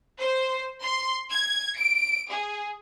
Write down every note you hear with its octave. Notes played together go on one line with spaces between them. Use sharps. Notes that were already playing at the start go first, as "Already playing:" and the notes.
C5
C6
G#6
D7
G#4